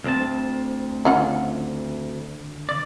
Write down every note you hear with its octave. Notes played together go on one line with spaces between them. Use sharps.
D2 C4 A5
D3 C#4 F4 F#5
D5